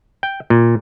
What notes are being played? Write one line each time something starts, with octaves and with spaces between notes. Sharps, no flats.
G5
A#2